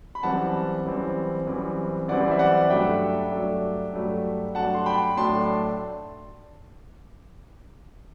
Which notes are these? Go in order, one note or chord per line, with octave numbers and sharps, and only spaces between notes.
B5
F#2 E3 G3 C4 F#5 A5
F#2 E3 G3 C4
F#2 E3 G3 C4
F#2 E3 G3 C4 D5 F#5
E5
D5 F#5
G2 F#3 A3 D4 E5 G5
G2 F#3 A3 D4
G2 F#3 A3 D4
G2 F#3 A3 D4 F#5 A5
C6
G5 B5
A2 F#3 A3 D4 A5 C6